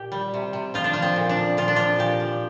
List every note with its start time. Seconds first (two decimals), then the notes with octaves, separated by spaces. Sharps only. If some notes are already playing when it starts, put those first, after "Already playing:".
Already playing: A#2 G4
0.12 G3
0.34 C3
0.53 C3
0.74 F3 F4
0.84 D4
0.93 F3 F4
1.02 C4
1.16 A#2
1.29 D4
1.37 F3
1.57 A#2 F4
1.68 D4
1.76 F3 F4
1.99 A#2 G4
2.20 F3